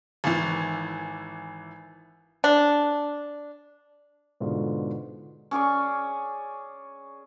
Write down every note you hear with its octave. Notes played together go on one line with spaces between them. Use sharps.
G#1 E3
D4
G#2 B2 D3 G#3 F4
C#4 G#4 D5 C#6